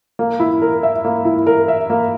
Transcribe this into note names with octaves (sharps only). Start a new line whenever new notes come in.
A#3
E4
A#4
E5
A#3
E4
A#4
E5
A#3